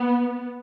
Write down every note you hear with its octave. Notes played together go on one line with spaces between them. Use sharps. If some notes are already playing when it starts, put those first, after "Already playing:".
Already playing: B3